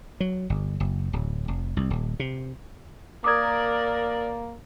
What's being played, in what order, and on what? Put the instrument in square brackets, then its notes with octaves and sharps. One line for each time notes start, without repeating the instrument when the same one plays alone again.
[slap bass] F#3
G1
F#1
D1
F1
C2
D#1
C3
[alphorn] A#3 [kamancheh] A#4 D5 [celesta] D6 D#6 G#6